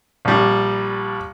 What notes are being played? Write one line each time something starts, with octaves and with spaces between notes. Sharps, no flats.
A#1 G3